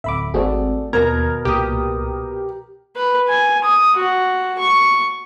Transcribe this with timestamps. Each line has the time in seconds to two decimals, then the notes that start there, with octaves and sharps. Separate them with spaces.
0.04 D1 E5 B5 D6
0.34 G#1 A3 C4 F#4 G#4 D5
0.93 D#2 B2 B3 A#4 A#5 G#6
1.45 C2 A#2 G4 D#6
2.96 B4
3.28 G#5
3.64 D#6
3.96 F#4
4.58 C#6